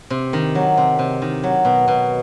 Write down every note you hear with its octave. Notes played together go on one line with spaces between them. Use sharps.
C3
D#3
F#3
C3
C3
D#3
F#3
B2
B2